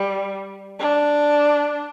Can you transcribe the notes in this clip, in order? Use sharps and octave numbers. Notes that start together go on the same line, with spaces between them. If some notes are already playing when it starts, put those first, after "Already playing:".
Already playing: G3
D4